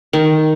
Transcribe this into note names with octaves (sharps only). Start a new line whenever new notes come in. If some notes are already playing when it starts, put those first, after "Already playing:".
D#3